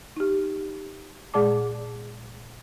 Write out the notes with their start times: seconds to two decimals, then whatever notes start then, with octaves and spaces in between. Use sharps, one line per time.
0.17 D#4 G4
1.34 A#2 G#3 G#4 D5 A5 D6